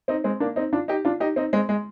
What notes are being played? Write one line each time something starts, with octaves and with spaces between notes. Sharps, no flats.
C4 D#4
G#3 C4
A#3 D4
C4 D#4
D4 F4
D#4 G4
D4 F4
D#4 G4
C4 D#4
G#3 C4
G#3